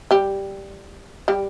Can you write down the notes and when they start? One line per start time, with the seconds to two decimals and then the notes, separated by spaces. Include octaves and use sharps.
0.11 G3 G4
1.28 G3 G4